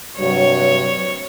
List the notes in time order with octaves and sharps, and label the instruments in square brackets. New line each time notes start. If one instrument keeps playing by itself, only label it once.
[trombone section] G2 C3 F#3 [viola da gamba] C#5